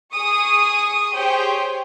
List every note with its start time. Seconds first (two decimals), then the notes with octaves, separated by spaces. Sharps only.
0.12 G#4 C#6 D#6
1.14 G4 G#4 C5 C#5 G5